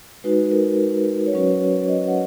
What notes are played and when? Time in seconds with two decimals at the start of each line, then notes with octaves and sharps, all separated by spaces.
0.24 G#3 D#4 F#4 B4
0.51 A#4
1.26 C#5
1.33 F#3 C#4 F#4 B4
1.88 D#5
2.08 F#5